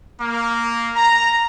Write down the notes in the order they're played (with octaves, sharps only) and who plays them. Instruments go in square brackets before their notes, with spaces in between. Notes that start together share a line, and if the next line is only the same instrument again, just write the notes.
[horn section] A#3
A#5